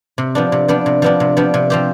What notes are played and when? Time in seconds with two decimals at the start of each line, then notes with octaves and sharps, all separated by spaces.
0.18 C3
0.35 F3 B3 D4
0.52 C3
0.68 F3 B3 D4
0.86 C3
1.02 F3 B3 D4
1.20 C3
1.37 F3 B3 D4
1.54 C3
1.70 F3 C4 G4